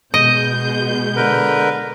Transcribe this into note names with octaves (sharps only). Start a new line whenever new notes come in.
B2 G#3 D#5 G6
D3 A#4 B4